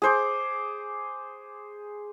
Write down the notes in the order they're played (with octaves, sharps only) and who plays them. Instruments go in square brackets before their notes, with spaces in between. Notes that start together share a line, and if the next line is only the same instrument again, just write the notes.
[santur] G#4 C5 D6